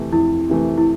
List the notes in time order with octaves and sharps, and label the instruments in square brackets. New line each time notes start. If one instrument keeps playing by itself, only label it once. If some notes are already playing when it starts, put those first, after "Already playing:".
Already playing: [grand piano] F2 C3 E3 A3
[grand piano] F2 [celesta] E4
[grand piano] C3 E3 A3
[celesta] E4